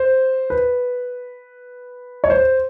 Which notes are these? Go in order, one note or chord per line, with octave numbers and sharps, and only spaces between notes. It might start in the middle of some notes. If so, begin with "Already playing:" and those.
Already playing: C5
B4
C#5
C5